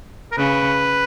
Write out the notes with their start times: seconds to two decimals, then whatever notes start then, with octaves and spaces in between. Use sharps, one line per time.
0.32 A#4
0.37 C#3 B4